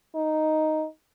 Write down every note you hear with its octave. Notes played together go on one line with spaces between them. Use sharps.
D#4